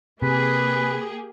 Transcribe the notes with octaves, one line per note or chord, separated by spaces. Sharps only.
C3 A#3 G4 G#4 B4